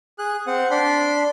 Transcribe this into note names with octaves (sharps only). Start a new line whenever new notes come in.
G#4 F#6
C4 F#5
D4 B5 C6